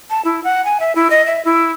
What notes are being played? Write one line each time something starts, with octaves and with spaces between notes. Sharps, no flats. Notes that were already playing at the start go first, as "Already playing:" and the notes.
A5
E4
F#5
G#5
E5
E4
D#5
E5
E4